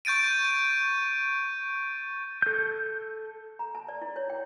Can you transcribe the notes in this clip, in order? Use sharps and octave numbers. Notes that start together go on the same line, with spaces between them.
C#6 G6 A6 D7 D#7
A4 G6
A#5
A5
D5
E4
C#5
G5